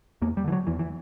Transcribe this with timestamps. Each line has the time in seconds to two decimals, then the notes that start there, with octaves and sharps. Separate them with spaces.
0.22 E2 A#3
0.37 G3
0.44 D3 E3
0.52 F#3
0.67 E2 E3
0.79 E3